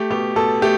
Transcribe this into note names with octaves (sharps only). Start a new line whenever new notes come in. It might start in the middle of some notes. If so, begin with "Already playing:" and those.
Already playing: A3 G4
B2 G4
B2 A4
A3 G4